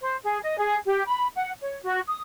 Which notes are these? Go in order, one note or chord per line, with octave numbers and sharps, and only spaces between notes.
C5
G#4
D#5
G#4
G4
B5
F#5
C#5
F#4
D#6